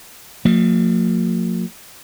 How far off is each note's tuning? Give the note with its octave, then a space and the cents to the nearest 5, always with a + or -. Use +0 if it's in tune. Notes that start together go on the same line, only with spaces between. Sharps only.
F3 +40 A#3 -40